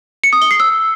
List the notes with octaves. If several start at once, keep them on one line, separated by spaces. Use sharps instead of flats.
C#7
D#6
G7
C7
E6